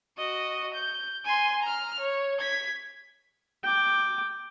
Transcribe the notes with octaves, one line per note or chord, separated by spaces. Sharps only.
F#4 D#5
G6
G#5 C6
A#5 F6
C#5
G#6 B6
G5 D6